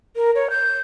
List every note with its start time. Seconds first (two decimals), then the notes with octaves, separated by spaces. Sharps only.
0.16 A#4
0.35 C#5
0.50 G6